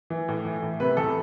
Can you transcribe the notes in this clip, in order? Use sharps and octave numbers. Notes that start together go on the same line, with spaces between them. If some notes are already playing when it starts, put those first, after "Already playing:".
E3
A2
E3
A2
C3 B4
E2 A4